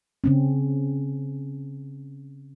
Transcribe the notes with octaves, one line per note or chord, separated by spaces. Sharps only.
C#3 C4 C#4